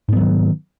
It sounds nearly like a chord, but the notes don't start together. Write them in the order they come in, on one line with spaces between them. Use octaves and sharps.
G#2 B3 F#3 D#3